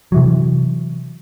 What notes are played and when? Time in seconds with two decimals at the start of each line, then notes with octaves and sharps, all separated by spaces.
0.12 C3 E3 F#3